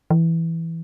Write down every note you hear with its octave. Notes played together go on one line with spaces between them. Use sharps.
E3